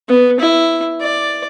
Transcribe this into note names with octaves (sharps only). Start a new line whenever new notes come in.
B3
E4
D5